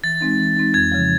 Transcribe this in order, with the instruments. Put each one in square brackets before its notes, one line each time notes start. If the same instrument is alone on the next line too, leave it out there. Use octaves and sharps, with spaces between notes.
[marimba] E3 [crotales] A6
[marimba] G#3 C4 D#4
E3
G#3 C4 D#4
[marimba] F2 [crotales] G#6
[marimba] C#3 F3